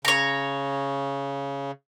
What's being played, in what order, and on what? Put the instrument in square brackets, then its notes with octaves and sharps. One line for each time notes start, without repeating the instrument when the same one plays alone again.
[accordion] C#3 [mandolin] C#5 A#5